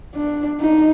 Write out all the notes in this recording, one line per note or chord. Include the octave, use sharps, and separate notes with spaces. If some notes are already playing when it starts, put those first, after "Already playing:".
D4
D#4